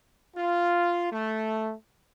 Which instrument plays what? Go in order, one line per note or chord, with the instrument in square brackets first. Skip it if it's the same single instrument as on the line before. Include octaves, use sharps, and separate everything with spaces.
[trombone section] F4
A3